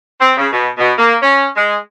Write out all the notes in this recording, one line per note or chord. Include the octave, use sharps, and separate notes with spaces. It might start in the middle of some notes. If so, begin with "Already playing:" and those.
C4
C#3
B2
B2
A#3
C#4
G#3